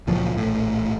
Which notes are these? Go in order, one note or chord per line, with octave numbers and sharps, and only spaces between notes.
C#2 A#2 F3 F#3
A#1 A2